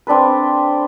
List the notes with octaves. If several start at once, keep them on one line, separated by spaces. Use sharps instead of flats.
C4 D4 A4 B4